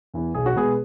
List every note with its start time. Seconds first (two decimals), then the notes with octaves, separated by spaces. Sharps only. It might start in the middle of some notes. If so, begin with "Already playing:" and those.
0.14 E2 E3 B3
0.35 B1 G#4
0.46 F#4
0.56 B2 G#3 B3 G#4